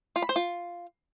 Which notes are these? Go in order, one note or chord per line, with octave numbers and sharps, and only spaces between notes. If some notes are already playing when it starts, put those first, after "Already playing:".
F4
B5
C5
F4